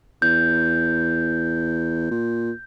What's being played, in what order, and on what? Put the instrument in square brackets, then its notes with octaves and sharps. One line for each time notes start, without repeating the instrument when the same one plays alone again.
[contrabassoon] E2 [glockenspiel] G6
[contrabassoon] A#2